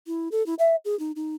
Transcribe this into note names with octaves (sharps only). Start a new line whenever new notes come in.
E4
A4
E4
E5
G#4
D#4
D#4